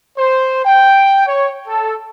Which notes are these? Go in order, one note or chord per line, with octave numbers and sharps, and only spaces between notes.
C5
G5
C#5
A4